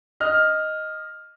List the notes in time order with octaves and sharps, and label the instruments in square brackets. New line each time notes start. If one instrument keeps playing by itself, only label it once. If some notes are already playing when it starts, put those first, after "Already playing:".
[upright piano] D#5 F6